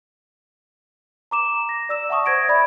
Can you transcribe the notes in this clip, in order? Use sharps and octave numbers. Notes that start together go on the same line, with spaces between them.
A#5 D6 E7
A#6
D5 E6 E7
E5 F#5 A5 C#6 D#6
C5 G#6 A#6 D7
D5 E5 B5 G#6